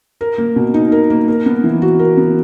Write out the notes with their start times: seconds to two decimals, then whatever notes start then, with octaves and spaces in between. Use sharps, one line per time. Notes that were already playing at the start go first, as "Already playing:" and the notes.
0.21 A#4
0.38 A#3
0.56 B2
0.74 D#4
0.92 A#4
1.10 A#3
1.28 A#4
1.46 B3
1.64 E3
1.82 F#4
1.99 A#4
2.17 B3